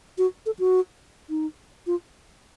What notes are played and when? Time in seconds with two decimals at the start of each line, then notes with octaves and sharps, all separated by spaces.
0.18 F#4
0.46 A4
0.59 F#4
1.30 D#4
1.87 F4